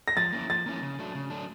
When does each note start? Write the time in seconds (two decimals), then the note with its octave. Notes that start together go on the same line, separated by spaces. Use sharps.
0.08 A#6
0.17 F3 A6
0.32 A#3 C#4 E4
0.50 F3 A6
0.66 A#3 C#4 E4
0.82 C#3
0.99 F#3 A3 D4
1.15 C#3
1.30 F#3 A3 D4